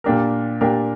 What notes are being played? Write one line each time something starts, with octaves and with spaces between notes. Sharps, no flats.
A#2 A#3 D4 G4 A#4
A#2 A#3 D4 G4 A#4